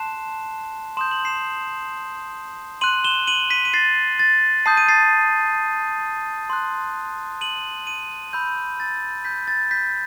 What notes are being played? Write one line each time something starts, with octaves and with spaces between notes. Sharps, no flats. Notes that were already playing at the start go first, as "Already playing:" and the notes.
Already playing: A5 C6 F#6 C7 E7
C6 D#6 G6 E7
F#7
C7 E7
C6 F#6 D#7 F#7
E7 G7
D#7 F#7
B6 D#7
D#7
A6 C7
A6
A5 D#6 G6 C7
D#7
A6 C7
C6 F#6
D#7 F#7
D#7 F#7
B5 E6 G6
A6
G6 B6
A6
G6 B6